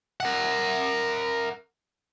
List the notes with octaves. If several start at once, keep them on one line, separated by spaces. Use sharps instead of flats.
A#4 F#5